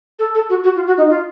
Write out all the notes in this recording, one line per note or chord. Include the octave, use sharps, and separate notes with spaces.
A4
A4
F#4
F#4
F4
F#4
D#4
F4